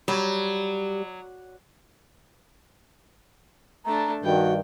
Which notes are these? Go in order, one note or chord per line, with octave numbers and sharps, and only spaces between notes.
F#3 G3
A3 D4 A#5
G2 D#3 F#4 G5